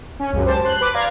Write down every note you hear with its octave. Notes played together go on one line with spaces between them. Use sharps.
C#4
C#2 F#2
G4 C5 A5
C6 F#6
B4 D6
D5 F5 A#5 G#6